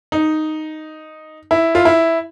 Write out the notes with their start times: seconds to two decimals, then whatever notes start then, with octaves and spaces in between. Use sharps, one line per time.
0.12 D#4
1.51 E4
1.75 F4
1.85 E4